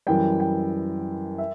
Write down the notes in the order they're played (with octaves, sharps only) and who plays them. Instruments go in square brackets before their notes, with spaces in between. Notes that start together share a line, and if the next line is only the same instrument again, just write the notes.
[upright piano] F#2 E3 G3 G5
G5
E5